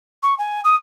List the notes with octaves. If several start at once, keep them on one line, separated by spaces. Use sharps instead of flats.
C#6
G#5
D#6